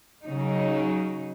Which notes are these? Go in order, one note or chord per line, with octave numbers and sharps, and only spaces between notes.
C#3 F#3 D#4